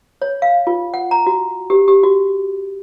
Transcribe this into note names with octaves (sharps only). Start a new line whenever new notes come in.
C#5
F5
F4
F#5
A#5
F#4
G4
G4
F#4